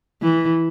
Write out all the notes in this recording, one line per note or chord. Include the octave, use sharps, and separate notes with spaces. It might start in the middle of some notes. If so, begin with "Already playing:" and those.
E3